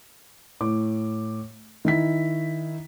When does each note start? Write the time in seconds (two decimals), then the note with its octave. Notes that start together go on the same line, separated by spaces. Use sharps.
0.61 A2 D6
1.85 D#3 E4 B6